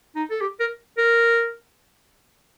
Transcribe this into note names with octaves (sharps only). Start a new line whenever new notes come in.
D#4
A4
G4
A#4
A#4